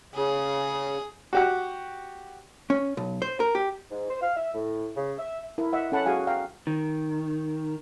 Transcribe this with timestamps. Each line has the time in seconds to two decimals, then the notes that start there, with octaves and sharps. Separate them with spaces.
0.14 C#3 G#4
1.33 F#4 G4 F#5
2.70 C#4
2.97 B1
3.22 C5
3.40 A#4
3.55 G4
3.91 G#2
4.09 C5
4.22 F5
4.36 E5
4.54 A2
4.96 C#3
5.18 E5
5.58 E4 A#4
5.73 D#5 E5 F#5
5.92 C#4 A4 F#5 A5 B5
6.06 F#4 G#4 F5 G#5
6.27 F5 G5 A#5
6.67 D#3